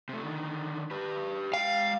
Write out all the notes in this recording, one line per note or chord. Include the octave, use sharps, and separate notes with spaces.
C3 A3
D3 D#3
G4 B4
G#3 F5 G5